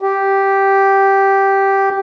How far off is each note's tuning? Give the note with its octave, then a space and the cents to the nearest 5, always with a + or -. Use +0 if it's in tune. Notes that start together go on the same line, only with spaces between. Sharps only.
G4 -5